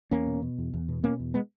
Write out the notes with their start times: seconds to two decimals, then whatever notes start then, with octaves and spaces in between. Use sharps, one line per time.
0.11 E2 A#3 C#4
0.27 B2
0.42 B2
0.58 E2
0.74 E2
0.89 B2
1.03 B2 A#3 C#4
1.20 E2
1.34 G#3 B3